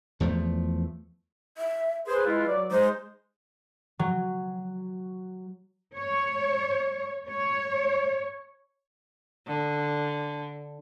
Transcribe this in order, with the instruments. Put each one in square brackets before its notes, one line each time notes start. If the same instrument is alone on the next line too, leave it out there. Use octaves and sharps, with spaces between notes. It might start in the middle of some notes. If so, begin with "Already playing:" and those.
[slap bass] E2 F3 A3
[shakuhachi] E5
[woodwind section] G#4 C5 [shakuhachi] B4
[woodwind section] G#3 E4 F4
F#3 D5
[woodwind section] G#3 D#4 [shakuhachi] C5
[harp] F#3
[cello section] C#5
C#5
[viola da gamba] D3